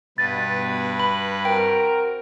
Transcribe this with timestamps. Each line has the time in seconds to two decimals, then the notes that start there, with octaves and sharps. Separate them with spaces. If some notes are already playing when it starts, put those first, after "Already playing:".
0.18 G2 B2 B4 A6
1.00 B5
1.45 C4 F#4 A#4 G5